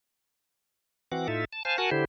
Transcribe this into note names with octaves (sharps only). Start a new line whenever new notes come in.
E3 C4 F#4 F#5 D6
A2 D#4 F4 A4 E5
A5
C5 F5 G#5 A5
F#4 A#4 F#5 G#5 A5
D3 E4 G4 C5